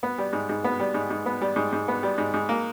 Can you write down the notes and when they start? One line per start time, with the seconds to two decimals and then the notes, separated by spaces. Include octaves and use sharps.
0.03 B3
0.18 G3
0.33 G#2
0.49 G#2
0.64 B3
0.80 G3
0.94 G#2
1.10 G#2
1.26 B3
1.41 G3
1.56 G#2
1.73 G#2
1.88 B3
2.03 G3
2.18 G#2
2.34 G#2
2.49 A#3